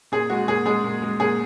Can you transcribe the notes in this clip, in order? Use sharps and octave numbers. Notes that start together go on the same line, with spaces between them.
A#2 G#4
G#3 F#4
A#2 G#4
G#3 G#4
A#2
G#3
A#2 G#4